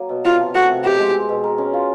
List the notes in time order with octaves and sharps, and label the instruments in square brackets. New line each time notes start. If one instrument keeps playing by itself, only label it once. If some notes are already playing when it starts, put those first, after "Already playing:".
Already playing: [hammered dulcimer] F#3 A#3
B2
[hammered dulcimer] C3 [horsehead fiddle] F4
[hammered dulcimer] F3
[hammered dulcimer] A3 [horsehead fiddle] F#4
[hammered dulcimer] C3
[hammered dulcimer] B2 [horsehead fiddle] G4
[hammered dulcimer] G#3
C4
B2
A#4
C#4
F4